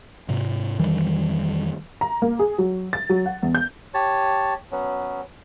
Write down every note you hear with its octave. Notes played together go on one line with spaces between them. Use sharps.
G#2 C3
F2 D#3 E3 G3
A#5
A#3
G#4
F#3
A6
F#3
F#5
E2
G6
G4 C#5 A5
F#3 B3 C#4